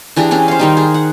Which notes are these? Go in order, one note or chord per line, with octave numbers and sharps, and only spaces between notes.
E3 D4 G4 G#4
C#4 G4 G#4
C5 F5
D#3 G3 D#4
G#4
F#5